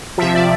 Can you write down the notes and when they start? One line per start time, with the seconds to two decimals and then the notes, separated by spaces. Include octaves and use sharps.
0.18 C3 F3 E5
0.34 D5